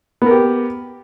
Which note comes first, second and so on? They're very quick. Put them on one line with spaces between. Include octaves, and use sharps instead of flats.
B3 A#4 G4